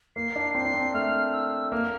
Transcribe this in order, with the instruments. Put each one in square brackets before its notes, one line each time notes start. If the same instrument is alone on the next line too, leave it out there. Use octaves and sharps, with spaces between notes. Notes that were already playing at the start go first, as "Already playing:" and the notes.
[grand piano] A#3 [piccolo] C7
[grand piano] D4
[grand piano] C4 [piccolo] C7
[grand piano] D4
C4
[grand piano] A3 [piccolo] F6
[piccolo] E6
[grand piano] A#3 [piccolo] F6